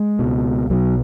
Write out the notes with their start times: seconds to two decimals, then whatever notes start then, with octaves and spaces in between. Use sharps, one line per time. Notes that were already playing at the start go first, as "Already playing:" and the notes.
Already playing: G#3
0.19 C#2 B2
0.70 B1 B2 F#3